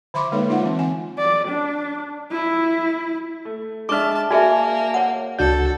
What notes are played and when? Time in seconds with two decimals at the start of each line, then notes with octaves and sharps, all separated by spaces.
0.14 D3 C5 E5 B5 C6 D6
0.32 G#3 A#3 D#4 A4 B4 C#5
0.49 D#4 F4 E5 F#5
0.64 E3 C4
0.79 G#5
1.18 D5
1.48 D4
2.32 E4
3.45 A3
3.89 G#3 D4 E5 A5 C#6 D6 F6
4.31 A#3 F#4 G#4 D5 E5 G#5 A5
4.94 C#5 F#5
5.39 C#2 D4 F#4 A4 G6